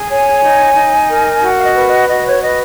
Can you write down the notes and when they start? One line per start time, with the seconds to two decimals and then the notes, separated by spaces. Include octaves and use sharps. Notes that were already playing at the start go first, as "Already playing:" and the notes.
Already playing: G#4
0.08 C#5 G#5
0.42 D#4
0.75 D#4
1.09 A#4
1.42 F#4 F#5
1.58 F5
1.63 D#5
1.75 B4
1.87 D#5
2.09 F#4 D#5
2.25 C#5
2.41 B4 D#5